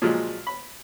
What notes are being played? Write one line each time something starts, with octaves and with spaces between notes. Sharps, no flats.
A#2 F3 F#3 G#3
B5